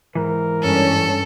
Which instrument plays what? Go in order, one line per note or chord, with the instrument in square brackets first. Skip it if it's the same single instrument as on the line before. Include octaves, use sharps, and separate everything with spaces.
[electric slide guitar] G#2 E3 [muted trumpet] A#4
[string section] G2 C#4 [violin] A4